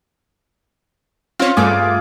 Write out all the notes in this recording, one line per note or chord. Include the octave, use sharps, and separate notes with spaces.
C4 C#4 F4
G2 A3 G#4 D6